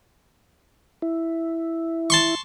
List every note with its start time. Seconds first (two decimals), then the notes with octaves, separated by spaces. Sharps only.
1.02 E4
2.10 A5 C6 C#6